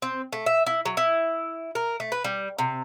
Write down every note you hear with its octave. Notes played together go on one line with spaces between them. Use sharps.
C4
A3
E5
E4
F#3
E4
A#4
A3
B4
G3
C3